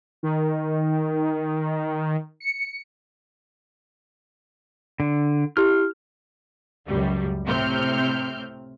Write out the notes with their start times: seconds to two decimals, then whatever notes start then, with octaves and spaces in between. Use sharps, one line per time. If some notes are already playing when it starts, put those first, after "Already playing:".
0.23 D#3
2.40 C#7
5.00 D3
5.57 E4 G4 F6
6.87 C#2 F#2 G3
7.45 A2 C3 C4 F6 G6